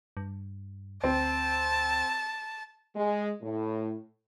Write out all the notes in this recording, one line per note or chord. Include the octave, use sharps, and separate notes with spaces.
G2
D2 C4 A5
G#3
A2